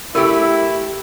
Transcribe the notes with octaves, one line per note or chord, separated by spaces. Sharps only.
A3 E4 G4 A#4 E6